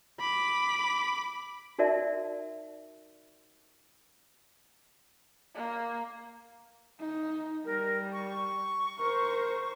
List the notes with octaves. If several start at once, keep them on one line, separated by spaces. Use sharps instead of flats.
B5 D6
D#4 F#4 A#4 D5 E5 A5
A#3
D#4
G3 A#4
C#6
A#4 C5